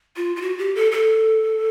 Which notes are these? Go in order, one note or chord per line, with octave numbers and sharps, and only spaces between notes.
F4
F4
F#4
G4
A4
A4